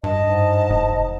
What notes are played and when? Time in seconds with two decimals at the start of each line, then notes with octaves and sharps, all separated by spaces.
0.04 G2 D#5 A5
0.24 G#2
0.70 F1